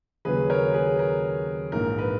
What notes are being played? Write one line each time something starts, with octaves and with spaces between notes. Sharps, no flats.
D#2 C#3 F#3 C#4 G#4 B4
A#4 C#5
G#4 B4
A#4
A#1 G#2 E3 A#4
B4